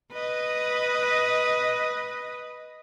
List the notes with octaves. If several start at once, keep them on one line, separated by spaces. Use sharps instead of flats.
B4 D#5